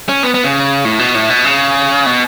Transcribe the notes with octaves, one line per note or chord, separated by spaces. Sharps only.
C#4
B3
B3
C#3
A2
B2
A2
B2
C#3
B2